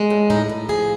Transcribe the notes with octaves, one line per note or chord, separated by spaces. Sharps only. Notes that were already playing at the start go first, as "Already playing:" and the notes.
Already playing: G#3
A2
A2 D#4
A2
F3 G#4